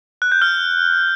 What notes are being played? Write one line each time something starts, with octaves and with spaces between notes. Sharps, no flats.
F#6
G6
F6